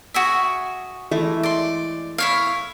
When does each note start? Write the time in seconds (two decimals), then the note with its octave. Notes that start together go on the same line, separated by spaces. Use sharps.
0.14 F#4 G#4 E5
1.11 E3 G#3 A3
1.43 D5 C6
2.18 E4 C#5 F5